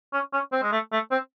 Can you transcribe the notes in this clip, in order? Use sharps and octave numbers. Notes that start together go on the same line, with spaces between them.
C#4
C#4
C4
G#3
A3
A3
C4